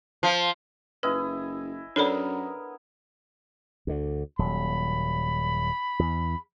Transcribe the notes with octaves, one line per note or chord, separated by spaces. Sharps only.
F3
F#1 E4 B4 D#5 G#5
F#2 B3 D4 A4 A#4 C#5 D5 B5
D2 D3
D#1 F#3 B5
E2